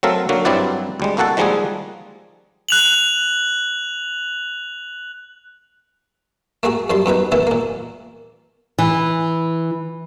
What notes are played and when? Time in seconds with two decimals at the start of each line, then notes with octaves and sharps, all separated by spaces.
0.03 F#3 A3 C4 A4 A#4 F5
0.29 D3 F#3 A#3 F#4
0.45 G2 F#3 C4 E4 D5 F#5
1.00 D2 G3 G#3
1.17 C2 A#3 F#4 A4 F#5 A5
1.37 D#3 F3 G3 G#3 A#3 G#4
2.69 F#6 F7 F#7
6.63 A3 A#3 F#4 G#4
6.90 F#2 F3 G3 C6
7.06 F#2 B3 D#4 B4
7.32 C#2 D#3 E3 B3 E4
7.47 A#2 A#3
8.78 E3